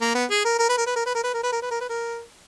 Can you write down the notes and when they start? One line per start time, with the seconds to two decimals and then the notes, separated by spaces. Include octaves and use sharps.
0.01 A#3
0.15 B3
0.30 G#4
0.45 A#4
0.59 A#4
0.69 B4
0.78 A#4
0.87 B4
0.96 A#4
1.06 B4
1.15 A#4
1.24 B4
1.34 A#4
1.43 B4
1.52 A#4
1.62 B4
1.71 A#4
1.81 B4
1.89 A#4